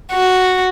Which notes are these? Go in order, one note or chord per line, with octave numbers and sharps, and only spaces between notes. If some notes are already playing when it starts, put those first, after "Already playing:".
F#4